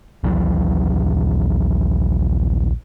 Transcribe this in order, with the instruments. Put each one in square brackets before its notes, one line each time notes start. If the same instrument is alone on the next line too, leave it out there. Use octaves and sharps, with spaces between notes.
[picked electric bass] A#1 D#2 E3 F#3